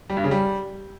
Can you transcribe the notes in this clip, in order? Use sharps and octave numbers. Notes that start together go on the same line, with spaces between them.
G3
G2
C#3
G3